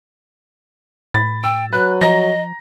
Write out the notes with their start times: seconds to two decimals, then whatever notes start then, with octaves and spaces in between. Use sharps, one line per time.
1.14 A2 B5 A6
1.44 G5 E6
1.73 F#3 B4 F#6
2.01 F3 D#5 A#5 A#6